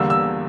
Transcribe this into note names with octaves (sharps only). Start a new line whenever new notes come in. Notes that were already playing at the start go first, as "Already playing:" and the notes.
Already playing: E2 D3 G3 A#3 E6
E6